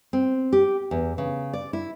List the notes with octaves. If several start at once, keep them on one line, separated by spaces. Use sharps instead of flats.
C4
G4
E2
C#3
D5
E4